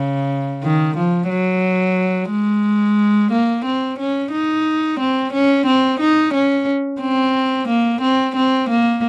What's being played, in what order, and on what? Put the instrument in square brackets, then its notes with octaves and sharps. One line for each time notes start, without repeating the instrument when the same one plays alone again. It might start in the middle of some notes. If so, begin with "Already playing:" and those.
Already playing: [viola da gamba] C#3
D#3
F3
F#3
G#3
A#3
C4
C#4
D#4
C4
C#4
C4
D#4
C#4
C4
A#3
C4
C4
A#3